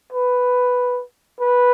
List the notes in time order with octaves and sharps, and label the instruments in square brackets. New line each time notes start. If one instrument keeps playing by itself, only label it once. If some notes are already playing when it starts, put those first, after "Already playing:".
[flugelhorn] B4
B4